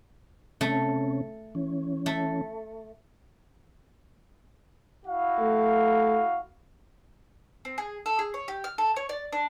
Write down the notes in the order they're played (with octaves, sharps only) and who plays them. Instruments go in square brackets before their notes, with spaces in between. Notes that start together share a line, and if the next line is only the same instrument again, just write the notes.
[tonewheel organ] C3 C#4 [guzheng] A3
[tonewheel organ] E3 C#4
[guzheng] A3
[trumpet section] E4 F#4 F5
[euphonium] A3
[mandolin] C4
G#4
A4
G#4
C#5
G4
F6
A4
C#5
D5
D4